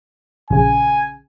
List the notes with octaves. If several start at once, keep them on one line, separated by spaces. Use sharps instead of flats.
A#1 C#3 G#5